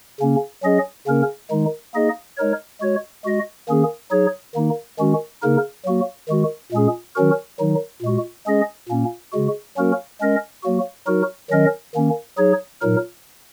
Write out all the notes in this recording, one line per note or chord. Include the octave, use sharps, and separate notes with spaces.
C#3 A#3 C#4
F#3 C#4 G#4 D#5
C#3 A#3 C#4 A#4
D#3 G#3 D#4
A#3 D#4 G#4 D#5
G#3 D#4 A#4 C#5
G#3 F#4 C#5
G#3 F#4 D#5
D#3 A#3 C#4 G#4
F#3 D#4 G#4 C#5
D#3 A#3 D#4
D#3 G#3 C#4 F#4
C#3 A#3 D#4 A#4
F#3 A#3 F#4
D#3 G#3 F#4
A#2 G#3 C#4 G#4
D#3 F#3 C#4 F#4 A#4
D#3 F#3 D#4
A#2 G#3 F#4
G#3 C#4 G#4 D#5
A#2 A#3 C#4
C#3 G#3 F#4
F#3 A#3 C#4 F#4 A#4
G#3 C#4 A#4 D#5
F#3 A#3 F#4
F#3 D#4 F#4 A#4
D#3 F#3 C#4 A#4 D#5
D#3 A#3 C#4
F#3 D#4 G#4 C#5
A#2 F#3 D#4 A#4